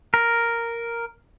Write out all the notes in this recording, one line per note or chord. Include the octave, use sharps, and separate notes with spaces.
A#4